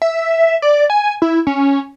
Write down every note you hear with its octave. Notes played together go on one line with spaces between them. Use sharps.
E5
D5
G#5
E4
C#4